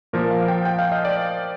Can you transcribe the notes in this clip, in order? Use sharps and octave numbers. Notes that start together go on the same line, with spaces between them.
A#2 F3 A#3 A#4
F5
G5
G5
F5
D#5
D5